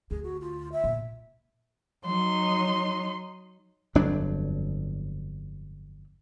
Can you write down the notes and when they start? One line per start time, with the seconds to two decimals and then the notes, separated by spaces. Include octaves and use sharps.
0.11 D2 G#4
0.24 F#4
0.41 F4
0.72 E5
0.84 A#2
2.06 F#3 D#4 C6
3.95 G1 F2 F#3 D4